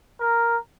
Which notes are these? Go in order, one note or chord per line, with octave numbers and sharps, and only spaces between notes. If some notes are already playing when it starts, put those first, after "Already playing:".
A#4